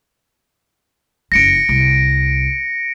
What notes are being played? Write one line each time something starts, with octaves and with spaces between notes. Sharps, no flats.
F#1 F2 A#6 C#7 D7
C2